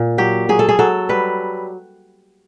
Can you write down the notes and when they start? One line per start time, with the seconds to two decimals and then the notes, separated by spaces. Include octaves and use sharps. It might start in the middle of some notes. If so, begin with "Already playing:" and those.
Already playing: A#2
0.18 F#3 G4
0.49 F#3 G#4
0.59 A4
0.69 G#4
0.79 F#3 A4
1.09 G3 B4